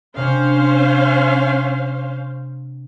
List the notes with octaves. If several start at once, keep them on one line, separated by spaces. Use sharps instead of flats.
C3 C#4 D4 C5 F5